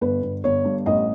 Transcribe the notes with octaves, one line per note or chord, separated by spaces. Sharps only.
G1 B4
G1
G1 C#5
G2
A1 D#5